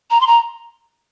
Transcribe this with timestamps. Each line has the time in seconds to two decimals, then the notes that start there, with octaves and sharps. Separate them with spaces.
0.10 A#5
0.20 C6
0.27 A#5